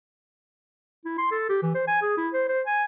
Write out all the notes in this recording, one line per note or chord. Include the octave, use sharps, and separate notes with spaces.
E4
C6
A4
G4
E3
C5
G#5
G#4
E4
C5
C5
G#5